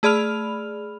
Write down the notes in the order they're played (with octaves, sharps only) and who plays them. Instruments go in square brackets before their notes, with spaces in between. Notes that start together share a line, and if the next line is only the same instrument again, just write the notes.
[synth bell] A3 G#4 D5 B5 F6 F7